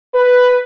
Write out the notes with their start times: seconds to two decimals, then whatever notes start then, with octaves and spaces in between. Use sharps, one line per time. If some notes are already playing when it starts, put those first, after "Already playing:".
0.15 B4